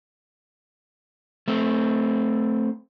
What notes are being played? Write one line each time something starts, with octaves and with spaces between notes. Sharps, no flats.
A3 C4